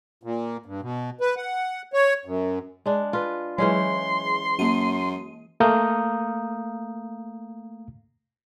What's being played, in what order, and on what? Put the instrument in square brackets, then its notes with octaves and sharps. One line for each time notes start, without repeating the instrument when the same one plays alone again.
[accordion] A#2
G2
B2
B4
F#5
C#5
F#2
[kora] G#3 D4
F4 B4
[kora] E3 G#3 C#4 [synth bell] F#3 G#4 [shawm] C6
[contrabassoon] F#2 [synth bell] A#3 D#7
[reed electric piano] A3 A#3 F5 A#5 D#6 G6